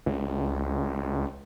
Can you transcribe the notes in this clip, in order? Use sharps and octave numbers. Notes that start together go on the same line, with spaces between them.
C#2